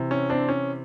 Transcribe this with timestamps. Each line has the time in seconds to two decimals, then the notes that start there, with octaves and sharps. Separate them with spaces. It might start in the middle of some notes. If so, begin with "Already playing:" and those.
Already playing: C3 E3
0.11 C#4
0.30 C4 D4
0.49 C#4